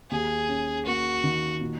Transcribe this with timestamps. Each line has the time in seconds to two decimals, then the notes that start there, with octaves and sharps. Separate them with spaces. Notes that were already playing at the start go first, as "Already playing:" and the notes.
0.10 D#2 G#4
0.48 C#4
0.85 A#3 F#4
1.24 D#3
1.61 A#2